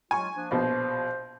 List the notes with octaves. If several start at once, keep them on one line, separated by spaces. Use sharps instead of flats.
F#3 G#3 F4 G#5 C#6
F3 A#3 D4
A#1 B2 C5